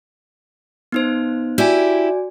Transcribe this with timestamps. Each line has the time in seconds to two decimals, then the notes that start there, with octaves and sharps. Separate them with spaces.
0.92 B3 D#4 C5
1.58 E4 F#4 G4 D5 G#5